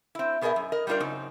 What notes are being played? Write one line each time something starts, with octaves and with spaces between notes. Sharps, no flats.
C4 E4
B2 B3 G#4 A#4 D#5 E5
F#2
A#4 D#5
G3 A3 D4 F4 A#4 D5
F#2 C#3 C4 D#4